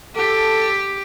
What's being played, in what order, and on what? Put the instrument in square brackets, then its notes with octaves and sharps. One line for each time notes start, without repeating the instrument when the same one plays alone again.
[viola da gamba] G4 [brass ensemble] A4